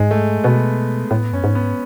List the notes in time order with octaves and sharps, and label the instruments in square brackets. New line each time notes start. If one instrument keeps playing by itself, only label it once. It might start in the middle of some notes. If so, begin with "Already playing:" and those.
Already playing: [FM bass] G#2 [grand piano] G#3
[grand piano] A3
[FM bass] B2 [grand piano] B3
[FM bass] A2 [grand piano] B3
[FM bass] F#2 [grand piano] C#4
[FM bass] G#2
[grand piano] B3